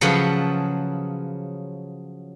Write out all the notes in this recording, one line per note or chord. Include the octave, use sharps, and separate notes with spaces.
C#3 F3 F#3 G#4 A4 B4